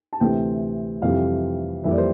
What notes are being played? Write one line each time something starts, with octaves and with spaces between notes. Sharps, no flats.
A5
D2 C3 E3 A3 C4 G5
F2 C3 E3 G3 C4 F5
F2 E3 G3 A#3 E5
D5
C5